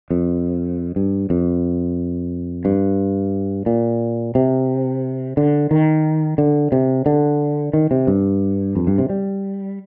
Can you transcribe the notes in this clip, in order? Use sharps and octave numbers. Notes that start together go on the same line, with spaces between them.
F2
G2
F2
G2
A#2
C3
D3
D#3
D3
C3
D3
D#3
C3
G2
F2
G2
C3
G3